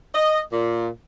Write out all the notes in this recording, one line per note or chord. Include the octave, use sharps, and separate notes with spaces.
D#5
A#2